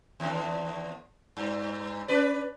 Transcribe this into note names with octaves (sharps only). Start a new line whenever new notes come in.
D#2 D3
G2
C#4 B4 D5